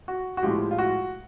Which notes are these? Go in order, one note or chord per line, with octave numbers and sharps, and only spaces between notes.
F#4
F#4
A2 F3 G#3 F4 G4
F4
F#4